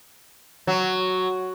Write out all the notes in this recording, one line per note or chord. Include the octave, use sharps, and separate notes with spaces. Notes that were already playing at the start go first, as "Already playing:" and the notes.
F#3